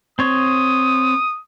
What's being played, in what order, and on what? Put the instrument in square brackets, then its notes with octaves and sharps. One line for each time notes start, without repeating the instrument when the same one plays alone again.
[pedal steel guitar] C4 C#5 [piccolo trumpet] D#6